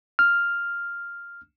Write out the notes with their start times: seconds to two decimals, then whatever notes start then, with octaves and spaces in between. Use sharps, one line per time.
0.19 F6